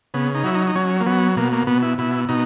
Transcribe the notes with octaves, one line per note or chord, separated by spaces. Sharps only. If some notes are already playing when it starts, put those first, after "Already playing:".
C#3 B3
D#4
F#3 E4
D#4
D#4
F#3 C#4
A#3
F#3 B3
B2 A#3
A#3
B2 B3
E4
B2 E4
B2 D#4